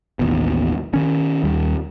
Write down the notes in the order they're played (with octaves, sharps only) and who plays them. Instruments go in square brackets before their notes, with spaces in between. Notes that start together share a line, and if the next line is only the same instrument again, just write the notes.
[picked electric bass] A1 D#2 B2
D#3 C#4
D#2 G3